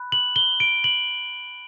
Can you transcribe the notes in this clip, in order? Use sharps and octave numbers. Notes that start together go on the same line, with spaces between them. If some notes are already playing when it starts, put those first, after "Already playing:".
Already playing: B5 F#6
F#7
G7
D7
F#7